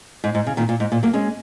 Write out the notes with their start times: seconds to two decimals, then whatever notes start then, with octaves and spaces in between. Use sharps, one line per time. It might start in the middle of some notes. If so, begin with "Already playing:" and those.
0.24 G#2
0.35 G#2
0.47 C#3
0.57 A#2 D#3
0.69 A#2
0.80 G#2
0.92 A#2
1.03 F#3 A#3
1.13 G#3 C#4